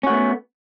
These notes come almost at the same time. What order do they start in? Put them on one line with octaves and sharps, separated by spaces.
C#4 F#4 A3 B3